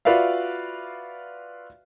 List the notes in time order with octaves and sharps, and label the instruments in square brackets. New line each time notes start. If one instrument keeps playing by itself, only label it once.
[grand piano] F4 F#4 B4 D5 E5 F5